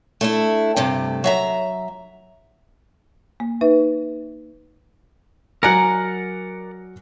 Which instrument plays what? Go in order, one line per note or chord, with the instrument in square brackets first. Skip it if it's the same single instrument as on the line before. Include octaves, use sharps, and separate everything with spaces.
[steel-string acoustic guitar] A3 D4 E4
G2 C3 A3
F#3 E5 A#5
[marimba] A#3
D#4 B4 E5
[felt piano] F#3 F#6 C#7 [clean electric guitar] A#4 D5 F#5 [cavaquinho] G#5 A#5